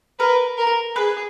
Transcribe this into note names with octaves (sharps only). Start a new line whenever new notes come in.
A#4 B4
A#4
G#4 B4